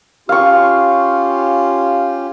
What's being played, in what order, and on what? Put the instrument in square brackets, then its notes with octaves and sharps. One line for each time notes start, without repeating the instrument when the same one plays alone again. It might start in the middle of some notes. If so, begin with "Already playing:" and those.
[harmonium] C#4 F4 G4 [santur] F5 C#6